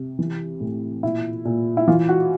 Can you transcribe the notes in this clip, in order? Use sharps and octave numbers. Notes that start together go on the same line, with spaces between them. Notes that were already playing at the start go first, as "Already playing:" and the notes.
Already playing: C3
E3
A2
A#2 E4
A#2
E4
E3 F4
F#4